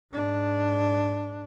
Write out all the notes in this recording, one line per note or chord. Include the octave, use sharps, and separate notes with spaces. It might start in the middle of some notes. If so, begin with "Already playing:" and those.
G#2 D4